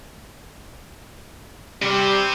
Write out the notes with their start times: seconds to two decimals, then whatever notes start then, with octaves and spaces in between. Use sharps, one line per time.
1.82 C3 G3 G4